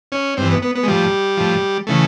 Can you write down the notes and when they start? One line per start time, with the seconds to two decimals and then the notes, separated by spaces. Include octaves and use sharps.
0.12 C#4
0.37 G2 E3 C4
0.50 B3
0.62 B3
0.75 B3
0.83 G#3
0.88 A2 F3 G3
1.37 A2 F3
1.87 C#3 E3 A3